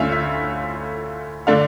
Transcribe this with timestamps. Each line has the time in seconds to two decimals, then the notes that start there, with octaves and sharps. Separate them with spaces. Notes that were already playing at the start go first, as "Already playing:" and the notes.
Already playing: D2 D3 A3 C#4 F4 E5 F5
0.12 E5
1.47 D3 A3 D4 F5